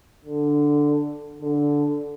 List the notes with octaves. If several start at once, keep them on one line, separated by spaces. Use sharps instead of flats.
D3
D3